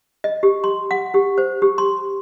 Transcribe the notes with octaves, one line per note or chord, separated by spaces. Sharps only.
D#5
G4
C6
F#5
G4
C5
G4
C6